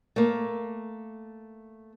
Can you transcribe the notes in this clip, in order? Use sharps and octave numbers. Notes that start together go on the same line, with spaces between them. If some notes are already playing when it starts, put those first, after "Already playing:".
A3 A#3